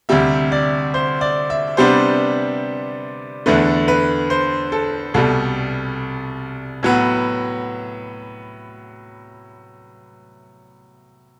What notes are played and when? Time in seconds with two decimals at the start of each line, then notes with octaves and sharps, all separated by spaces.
0.09 D2 C3 G3 E5
0.52 D5
0.94 C5
1.21 D5
1.50 E5
1.77 C3 G3 B3 D4 C5
3.46 E2 D3 A3 B4
3.88 B4
4.30 C5
4.72 A4
5.14 C2 B2 G3 A4
6.83 A2 F#3 B3